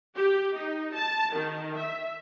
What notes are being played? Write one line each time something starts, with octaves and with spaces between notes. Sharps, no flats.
G4
D#4
A5
D#3
E5